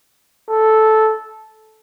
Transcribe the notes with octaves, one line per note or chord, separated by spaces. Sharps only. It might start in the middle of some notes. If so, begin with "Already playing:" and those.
A4